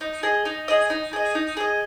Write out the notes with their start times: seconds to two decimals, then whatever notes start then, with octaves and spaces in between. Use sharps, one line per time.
0.01 D#4
0.23 G#4 D#5
0.45 D#4
0.68 G#4 D#5
0.90 D#4
1.13 G#4 D#5
1.35 D#4
1.57 G#4 D#5